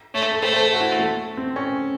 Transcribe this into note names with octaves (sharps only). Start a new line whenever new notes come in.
A3 C#5
A4
A3 C5
C5
A4
F#4
E4
A3
C4
C#4